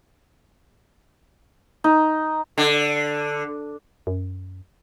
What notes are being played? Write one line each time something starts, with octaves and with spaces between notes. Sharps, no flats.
D#4
D3
F#2